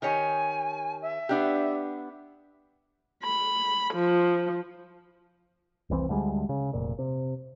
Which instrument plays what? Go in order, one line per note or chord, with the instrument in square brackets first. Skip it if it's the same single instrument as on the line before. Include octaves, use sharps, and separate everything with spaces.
[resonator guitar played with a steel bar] D#3 G4 C#5 [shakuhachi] G#5
[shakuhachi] E5
[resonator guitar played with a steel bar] B3 D4 G4
[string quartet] B5
F3
[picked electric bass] F1 C2 E3 C4
D2 D3 G3 G#3
C#3
F1 A#2
C3